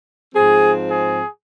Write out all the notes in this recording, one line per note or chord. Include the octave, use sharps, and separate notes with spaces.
G#2 F3 C4 G#4
G#4